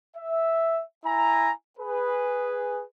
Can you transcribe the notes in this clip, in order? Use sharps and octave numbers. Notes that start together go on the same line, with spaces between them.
E5
E4 G#5 A#5
G#4 B4